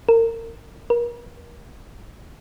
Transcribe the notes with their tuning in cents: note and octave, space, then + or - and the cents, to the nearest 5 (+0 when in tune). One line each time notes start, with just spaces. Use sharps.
A#4 -30
A#4 +35